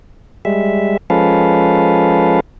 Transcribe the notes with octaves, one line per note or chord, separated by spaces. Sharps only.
G3 G#3 E5
F3 G#3 C#4 A4 B4 F5